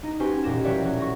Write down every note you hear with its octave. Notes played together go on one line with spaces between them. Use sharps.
D#4
C#4 F#4 G4 B4 C5 G#5
E1 D#2 A#2 G4 A#6 E7
F#3 G3 B4 C#5 D5 E5
F#3 C#4 F#4
C#6 A#6